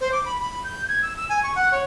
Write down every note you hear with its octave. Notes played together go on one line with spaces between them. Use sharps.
C5
D6
B5
B5
G6
G#6
E6
E6
G#5
C#6
F#5
C#5